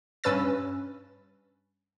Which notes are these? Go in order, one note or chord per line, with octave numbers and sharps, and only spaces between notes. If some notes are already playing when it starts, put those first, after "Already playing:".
G2 C#4 B4 E6 A6